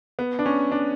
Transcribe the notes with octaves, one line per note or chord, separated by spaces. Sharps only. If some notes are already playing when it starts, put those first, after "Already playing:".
B3
D4
C#4
D4